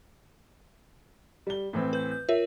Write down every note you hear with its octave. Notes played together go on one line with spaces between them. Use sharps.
G3 G7
A2 E3 C4
B4 G6
G6
F4 A#4 C#5 E5